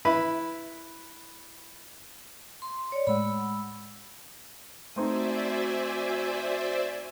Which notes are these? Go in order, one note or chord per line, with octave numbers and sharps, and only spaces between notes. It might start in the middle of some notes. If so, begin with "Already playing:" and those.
E4 B4 B5
C6
C#5 D5
A2 G#3 F#5 B5 E6
A3 C4 D#4 F#4 C5 D5 E5 G#5